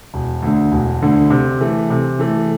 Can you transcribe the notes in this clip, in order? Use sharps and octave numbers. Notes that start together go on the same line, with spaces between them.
E1
D2 D3
E1
D2 D3
C3
E3 A3
C3
E3 A3